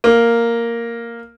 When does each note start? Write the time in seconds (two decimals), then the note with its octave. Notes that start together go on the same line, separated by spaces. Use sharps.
0.04 A#3